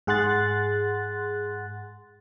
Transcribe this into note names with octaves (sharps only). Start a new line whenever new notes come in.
G#2 G#4 F#5 C6 F#6 A6